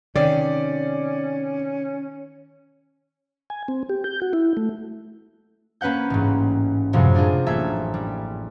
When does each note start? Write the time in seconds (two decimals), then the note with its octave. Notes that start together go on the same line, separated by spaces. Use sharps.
0.16 C3 D#3 C#4 D5
3.50 G#5
3.68 C4
3.89 G4
4.04 G6
4.22 F#4
4.33 E4
4.57 A3
5.81 A#3 C#4 B4 F#5 G6
6.10 A1 G#2
6.93 F#2 A2 C3 F3 F#3 G#3
7.14 C4 D4 F4 G#4
7.46 A1 A#3 A4 E5 G#6
7.94 G3